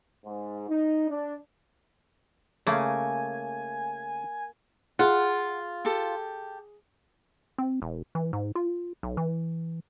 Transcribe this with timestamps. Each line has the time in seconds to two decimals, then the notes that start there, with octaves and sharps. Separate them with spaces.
0.25 G#2
0.69 D#4
1.08 D4
2.67 C#3 A3 A#3 G#5
4.99 F4 G#4 F#5
5.85 G4 A4
7.58 C4
7.82 E1
8.15 E3
8.33 G#2
8.55 F4
9.03 B1
9.17 E3